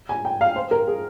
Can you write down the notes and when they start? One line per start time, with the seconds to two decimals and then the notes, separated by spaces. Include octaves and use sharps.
0.09 G#5
0.25 G5
0.41 F5
0.56 C5
0.71 A#4
0.87 G#4